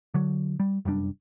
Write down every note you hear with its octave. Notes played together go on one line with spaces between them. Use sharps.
D3 F#3
G3
F1 F#2 G3 D4